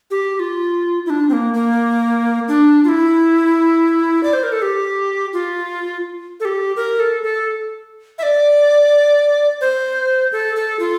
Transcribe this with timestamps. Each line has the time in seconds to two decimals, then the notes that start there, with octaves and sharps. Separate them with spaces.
0.11 G4
0.35 G4
0.40 F4
1.06 E4
1.10 D4
1.29 C4
1.33 A#3
1.54 A#3
2.48 D4
2.84 F4
2.89 E4
4.23 D5
4.33 C5
4.43 A#4
4.52 A4
4.62 G4
5.33 F4
6.40 A4
6.45 G4
6.76 A#4
7.00 A4
7.23 A4
8.18 E5
8.23 D5
9.61 C5
10.32 A4
10.56 A4
10.80 F4